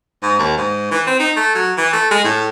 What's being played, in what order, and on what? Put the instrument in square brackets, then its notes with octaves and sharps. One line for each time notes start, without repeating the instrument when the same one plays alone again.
[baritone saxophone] G#2
D#2
G#2
E3
C4
D#4
A3
F#3
E3
A3
G#3
A2